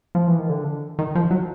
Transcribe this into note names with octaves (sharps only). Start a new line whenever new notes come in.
F3
E3
D#3
D3
D#3
F3
F#3